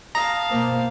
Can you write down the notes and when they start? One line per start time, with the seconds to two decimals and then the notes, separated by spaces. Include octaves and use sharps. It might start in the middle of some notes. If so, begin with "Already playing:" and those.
0.15 F5 A5 A#5 D#6
0.50 B2 A#3 C5